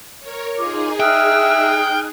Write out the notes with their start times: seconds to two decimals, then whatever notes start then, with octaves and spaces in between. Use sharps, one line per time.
0.19 A#4 C#5
0.57 D#4 F4 G#4 D6
1.00 E5 G5 D#6 F6 F#6